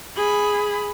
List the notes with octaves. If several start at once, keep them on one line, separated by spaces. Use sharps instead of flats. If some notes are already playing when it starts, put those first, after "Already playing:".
G#4 B5